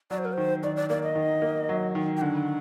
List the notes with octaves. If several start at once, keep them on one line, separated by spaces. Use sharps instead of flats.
F#3 D5
C5
A#4
D#3 C5
D#3 D5
D5
A#3 D5
D#5
D#3
A#3
F#3
D#3
G5
D3 F#5